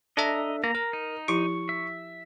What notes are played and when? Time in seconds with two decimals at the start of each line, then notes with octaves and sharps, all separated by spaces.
0.17 D4 A4 D#5 E5 A#5
0.64 A#3 A#5
0.75 A#4
0.93 D#4
1.28 F3 E4 G4 C#6
1.69 E5